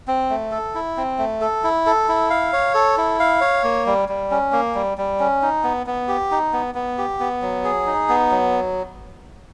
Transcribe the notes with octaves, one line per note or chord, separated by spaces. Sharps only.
C4
A3
A4
E4
C4
A3
A4
E4
A4
E4
F5
C#5
A4
E4
F5
C#5
A#3
G3
G3
C#4
A#3
G3
G3
C#4
D#4
B3
B3
G4
D#4
B3
B3
G4
B3
F#3
G#4
D#4
B3
F#3